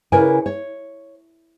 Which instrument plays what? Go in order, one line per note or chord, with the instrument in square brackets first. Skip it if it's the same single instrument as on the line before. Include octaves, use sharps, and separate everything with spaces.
[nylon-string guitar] C#3 E4 A#4 B4 D5 G#5
C#5